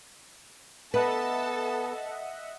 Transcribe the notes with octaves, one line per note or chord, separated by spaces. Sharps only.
B3 A4 B4 D#5 E5 F#5 A5